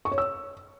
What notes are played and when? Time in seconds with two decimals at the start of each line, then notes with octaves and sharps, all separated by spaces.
0.05 C#6
0.12 C#5
0.18 E6